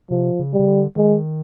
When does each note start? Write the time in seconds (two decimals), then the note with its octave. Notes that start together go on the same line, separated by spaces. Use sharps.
0.10 C3 F3
0.39 C#3
0.53 G3
0.59 C#3
0.67 D3
0.96 D#3 G#3